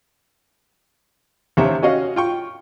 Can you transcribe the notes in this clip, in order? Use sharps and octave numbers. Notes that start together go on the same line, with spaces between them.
D#2 C3 C#4 E5 A#5
C#4 F#4 D#5 F5
F4 G5 C#6